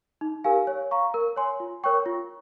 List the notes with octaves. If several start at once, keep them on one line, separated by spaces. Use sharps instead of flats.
D#4
G4 A#4 F5 G#5
C#5
F5 A#5 C#6
A#4
C#5 G#5 C6
F4
A#4 C#5 G5 C#6
F4